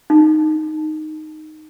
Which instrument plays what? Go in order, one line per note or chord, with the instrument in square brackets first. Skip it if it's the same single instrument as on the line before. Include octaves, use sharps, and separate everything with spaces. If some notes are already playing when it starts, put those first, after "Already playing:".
[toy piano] D#4